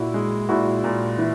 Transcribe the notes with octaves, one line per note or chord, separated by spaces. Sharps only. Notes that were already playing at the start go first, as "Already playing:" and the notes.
Already playing: A#2 E4 F#4
G#3
A#2 E4 F#4
A#2
E3